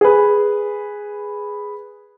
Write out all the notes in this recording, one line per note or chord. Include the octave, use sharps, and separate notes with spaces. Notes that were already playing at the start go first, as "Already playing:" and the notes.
G#4 B4